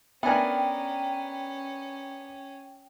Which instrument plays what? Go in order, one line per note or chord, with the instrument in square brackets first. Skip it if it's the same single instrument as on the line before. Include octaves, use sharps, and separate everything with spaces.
[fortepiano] B3 D4 A#4 [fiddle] C#4 [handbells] E5 G#5 [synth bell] G5